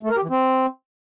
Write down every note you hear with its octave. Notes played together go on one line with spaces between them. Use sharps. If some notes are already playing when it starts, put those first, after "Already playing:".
A3
A#4
G4
E3
C4